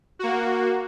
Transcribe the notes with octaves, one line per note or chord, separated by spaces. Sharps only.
A#3 F#4